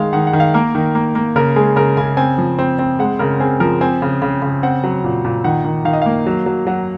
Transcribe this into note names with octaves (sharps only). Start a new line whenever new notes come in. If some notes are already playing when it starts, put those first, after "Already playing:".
Already playing: D#3 G#3 F5
D#3 F#5
F#5
D#3
F5
A#3 A#4
D#3
A#3
A#3
C#3 A#4
G#3 G#4
C#3 A#4
C#3 G#5
C4 G#5
F3
C4
C4
G#3 F#5
C#3 A#4
C4 G#4
F3 A#4
C4 G#5
C#3
C#3
C#3
C4 F#5
F#3
A#2
A#2
D#3 F#5
D#3
D#3 F5
D#5
A#3 F5
F#3
F#3
F#3 F#5